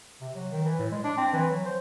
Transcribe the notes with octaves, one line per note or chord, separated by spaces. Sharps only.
C3
F#3
D#3
E3
A2
G#3
D4
C4
E3
F#3
C5